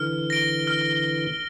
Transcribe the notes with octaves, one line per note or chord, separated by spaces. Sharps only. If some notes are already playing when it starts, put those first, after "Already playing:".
Already playing: D3 E3 F6
A#6 D7 G7
F6